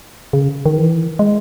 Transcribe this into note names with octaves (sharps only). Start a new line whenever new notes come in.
C#3
D#3
E3
G#3